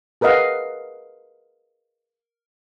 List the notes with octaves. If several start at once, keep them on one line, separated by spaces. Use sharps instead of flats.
G#4 A#4 B4 D#5 F5 F#5